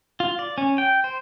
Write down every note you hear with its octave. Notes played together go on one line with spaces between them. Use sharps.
F4
D5
C#4
G5
C5